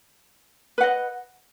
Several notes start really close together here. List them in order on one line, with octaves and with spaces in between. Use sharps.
B4 F#5 D#5